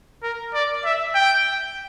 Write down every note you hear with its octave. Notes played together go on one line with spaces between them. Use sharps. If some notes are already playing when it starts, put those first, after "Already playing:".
A#4
D5
E5
G5